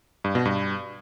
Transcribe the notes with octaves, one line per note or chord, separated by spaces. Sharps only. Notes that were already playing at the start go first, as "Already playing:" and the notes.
G2
B2
G2